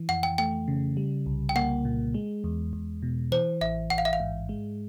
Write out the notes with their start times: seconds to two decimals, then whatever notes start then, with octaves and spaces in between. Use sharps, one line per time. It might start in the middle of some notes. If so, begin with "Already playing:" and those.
Already playing: E3
0.09 F2 F#5
0.23 G5
0.38 A3 G5
0.68 C#3
0.97 G3
1.26 C2
1.49 G5
1.56 A#3 F#5
1.85 A#2
2.14 G#3
2.44 E2
2.73 E2
3.03 B2
3.32 E3 C5
3.61 A1 E5
3.90 A1 F#5
3.98 F5
4.05 E5
4.13 F5
4.20 G#2
4.49 G#3